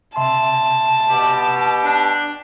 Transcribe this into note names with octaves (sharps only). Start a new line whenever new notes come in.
C3 E5 A5 C6
B2 G4
D4